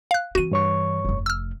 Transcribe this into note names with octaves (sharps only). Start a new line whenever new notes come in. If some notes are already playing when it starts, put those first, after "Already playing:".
F5 F#6
E3 C4 F#4 D#7
G2 C#5 C#6
F1 A3
E6 F6